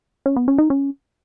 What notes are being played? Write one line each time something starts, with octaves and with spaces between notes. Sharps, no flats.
C#4
B3
C#4
D#4
C#4